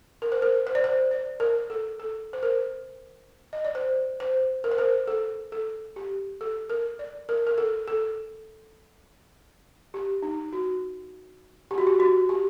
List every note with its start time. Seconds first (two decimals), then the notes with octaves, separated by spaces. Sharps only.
0.22 A#4
0.32 C5
0.42 A#4
0.67 C5
0.75 D5
0.84 C5
1.11 D5
1.40 A#4
1.70 A4
2.00 A4
2.33 C5
2.43 A#4
3.53 D#5
3.65 D5
3.75 C5
4.20 C5
4.64 A#4
4.71 C5
4.78 A#4
5.07 A4
5.52 A4
5.96 G4
6.41 A4
6.70 A#4
6.99 D5
7.29 A#4
7.47 A#4
7.58 A4
7.88 A4
9.94 G4
10.23 D#4
10.53 F#4
11.71 G4
11.78 F#4
11.87 G4
12.00 F#4
12.29 G4